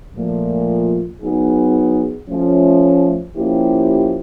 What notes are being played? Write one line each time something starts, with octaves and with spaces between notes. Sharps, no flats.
A#2 F3 A3
F#3 B3 D#4 G#4
F3 A3 C#4
F3 A#3 C#4 E4 G4